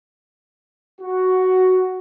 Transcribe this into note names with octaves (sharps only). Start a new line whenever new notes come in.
F#4